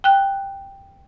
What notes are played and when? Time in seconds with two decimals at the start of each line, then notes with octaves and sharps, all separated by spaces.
0.04 G5 F#6